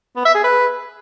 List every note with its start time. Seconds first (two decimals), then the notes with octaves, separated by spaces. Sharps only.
0.16 B3
0.25 E5
0.35 G#4
0.44 B4